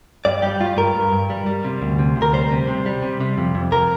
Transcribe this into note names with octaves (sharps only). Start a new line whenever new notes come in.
G2 D5
G3 G4
G2 F4
G2 A#4
G2
G2
G3
G3
C3
D2
C3
D2
A#4
G3 C5
C3
C3
G3
C3
C3
F2
F2
F2 A#4